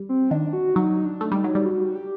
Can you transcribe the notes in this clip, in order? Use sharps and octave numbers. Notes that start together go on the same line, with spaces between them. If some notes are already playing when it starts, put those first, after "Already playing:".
Already playing: G3
C4
D#3 D4
F#4
F#3 D#4
D4
A3
G3 D#4
F#3
G3
F#4
G4